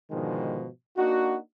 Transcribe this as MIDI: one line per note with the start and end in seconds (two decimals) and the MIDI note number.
0.11 0.68 44
0.11 0.68 47
0.11 0.68 50
0.11 0.68 51
0.11 0.68 53
0.11 0.68 56
0.97 1.37 58
0.97 1.37 62
0.97 1.37 63
0.97 1.37 66